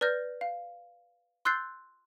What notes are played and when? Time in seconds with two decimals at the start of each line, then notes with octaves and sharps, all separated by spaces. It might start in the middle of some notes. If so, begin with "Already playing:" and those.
0.01 B4 D5 F6 G6 A#6
0.41 F5
1.45 C6 E6 F#6 G6 A6 C7